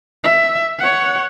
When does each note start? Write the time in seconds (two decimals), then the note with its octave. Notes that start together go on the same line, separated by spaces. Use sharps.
0.24 E5
0.79 C#5 F#5